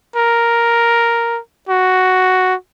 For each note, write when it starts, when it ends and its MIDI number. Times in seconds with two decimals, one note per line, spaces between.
0.16 1.39 70
1.69 2.54 66